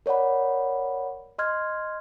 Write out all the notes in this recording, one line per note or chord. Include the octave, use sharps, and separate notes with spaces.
A#4 C#5 D5 F#5 B5
D#5 C6 F6 G#6